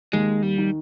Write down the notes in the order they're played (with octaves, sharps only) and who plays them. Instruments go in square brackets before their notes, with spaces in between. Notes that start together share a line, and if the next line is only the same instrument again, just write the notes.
[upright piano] D#2 [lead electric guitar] G#3
[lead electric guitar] G3
[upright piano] D#3